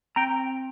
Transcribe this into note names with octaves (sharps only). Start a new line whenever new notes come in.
C4 G5 A#5